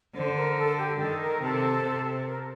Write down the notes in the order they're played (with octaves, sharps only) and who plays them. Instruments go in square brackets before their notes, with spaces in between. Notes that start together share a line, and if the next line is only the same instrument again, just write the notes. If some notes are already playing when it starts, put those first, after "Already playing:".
[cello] D3 [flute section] C5
[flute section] A#4
A4
G4
[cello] D#3 [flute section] A4
[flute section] A#4
[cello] C3 [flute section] A4
[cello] C3
[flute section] A#4